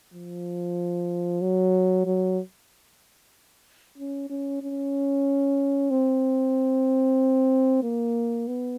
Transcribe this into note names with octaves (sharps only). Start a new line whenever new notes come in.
F3
F#3
F#3
C#4
C#4
C#4
C4
A#3
B3